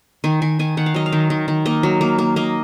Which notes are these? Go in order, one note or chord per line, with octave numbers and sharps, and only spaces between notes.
D#3 G#5
D#3 G#5
D#3 G#5
D#3 F#5
F5
F#3 D#5
F5
D#3
D#3
D#3
A#3 D#5
F#3
A#3
A#3
A#3 D#5